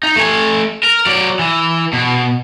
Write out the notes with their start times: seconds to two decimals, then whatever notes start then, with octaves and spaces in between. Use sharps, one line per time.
0.03 D#4
0.16 A3 G#5
0.83 A#4
1.06 F#3 D5
1.39 E3
1.93 B2